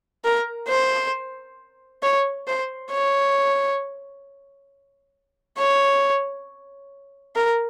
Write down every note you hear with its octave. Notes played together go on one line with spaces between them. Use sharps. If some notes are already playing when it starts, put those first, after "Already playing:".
A#4
C5
C#5
C5
C#5
C#5
A#4